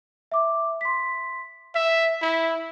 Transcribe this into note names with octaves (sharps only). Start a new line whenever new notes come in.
E5 D6
C6 B6
E5 B6
E4